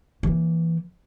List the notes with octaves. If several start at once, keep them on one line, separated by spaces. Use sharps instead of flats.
E3 A#3